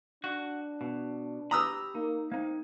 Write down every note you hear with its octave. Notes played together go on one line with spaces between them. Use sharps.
D4 F#4
B2
G4 A#5 B5 D#6 E6
A#3 D#4
A#3 C4 D#4